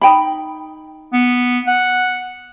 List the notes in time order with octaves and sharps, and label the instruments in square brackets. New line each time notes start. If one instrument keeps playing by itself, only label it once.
[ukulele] D#4 G5 B5
[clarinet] B3
F#5